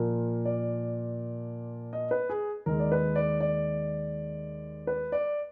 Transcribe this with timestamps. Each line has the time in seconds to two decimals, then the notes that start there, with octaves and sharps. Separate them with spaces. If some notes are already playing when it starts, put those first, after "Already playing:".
Already playing: A#2 F3 A#3 A#4
0.45 D5
1.93 D#5
2.11 B4
2.30 G#4
2.66 D#2 D#3 G#3 A#4
2.80 D5
2.92 B4
3.16 D5
3.40 D5
4.87 B4
5.12 D5